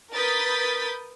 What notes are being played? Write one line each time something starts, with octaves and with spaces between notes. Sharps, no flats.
A#4 B4 D#6 G6 A6 B6